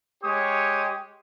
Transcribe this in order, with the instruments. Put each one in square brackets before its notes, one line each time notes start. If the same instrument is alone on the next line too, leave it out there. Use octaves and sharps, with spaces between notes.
[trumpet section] G#3 G4 C#5 D#6